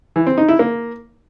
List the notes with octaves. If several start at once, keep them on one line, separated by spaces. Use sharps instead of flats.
E3
C4
D#4
E4
A#3